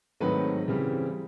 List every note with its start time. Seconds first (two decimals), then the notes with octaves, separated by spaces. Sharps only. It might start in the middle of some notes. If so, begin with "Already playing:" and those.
0.20 G#2 D#3 F#3 A3 C4 B4
0.68 C#3 E3 G3 C4